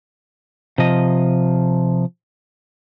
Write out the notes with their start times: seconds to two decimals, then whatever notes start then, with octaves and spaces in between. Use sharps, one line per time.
0.78 C3 F3 D#5